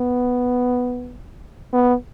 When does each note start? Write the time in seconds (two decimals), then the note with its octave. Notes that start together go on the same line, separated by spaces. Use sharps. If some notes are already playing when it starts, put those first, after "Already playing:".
Already playing: B3
1.73 B3